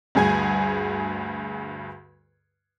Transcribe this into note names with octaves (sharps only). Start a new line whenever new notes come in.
D2 G2 G#4 G#5 G#6